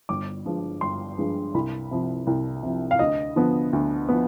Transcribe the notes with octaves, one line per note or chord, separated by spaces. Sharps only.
G1 D6
G2 F3 G#3
G1 C6
G2 F3 G#3
C2 B5
C3 F3
C2
C3 F3
F5
D2 D#5
D3 F3 B3
D2
F3 B3